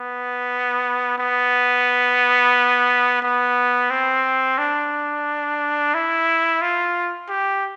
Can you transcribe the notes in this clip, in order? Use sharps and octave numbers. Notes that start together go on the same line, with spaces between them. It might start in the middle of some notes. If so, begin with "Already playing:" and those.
Already playing: B3
B3
B3
C4
D4
E4
F4
G4